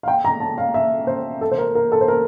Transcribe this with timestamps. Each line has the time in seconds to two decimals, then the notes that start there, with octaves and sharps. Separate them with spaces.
0.03 F5
0.08 G5
0.25 A#5
0.40 A5
0.58 F5
0.74 E5
1.07 C5
1.41 A4
1.52 C5
1.58 A#4
1.75 A#4
1.92 A4
2.01 C5
2.08 A#4